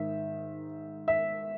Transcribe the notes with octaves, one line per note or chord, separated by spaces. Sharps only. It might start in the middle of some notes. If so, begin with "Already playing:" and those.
Already playing: G#2 D#3 E5
E5